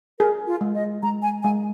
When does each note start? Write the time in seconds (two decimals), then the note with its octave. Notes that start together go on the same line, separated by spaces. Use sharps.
0.19 G#4 A#4
0.47 F4
0.61 G#3
0.75 D#5
1.03 G#3 A#5
1.22 G#5
1.43 G#3 G#5